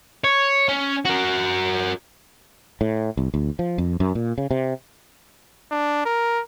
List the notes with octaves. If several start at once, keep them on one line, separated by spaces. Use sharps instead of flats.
C#5
C#4
F#4 A#4
A2
C2
D2
F3
F2
F#2
A#2
C#3
C3
D4
A#4